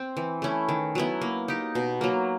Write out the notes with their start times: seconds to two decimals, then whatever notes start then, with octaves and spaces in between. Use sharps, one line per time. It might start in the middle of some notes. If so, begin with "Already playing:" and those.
Already playing: C4
0.17 E3
0.42 A3 C#4 E4
0.69 D#3
0.95 F#3 B3 E4
1.21 A#3
1.48 D#4 G4
1.75 B2
2.01 F#3 A#3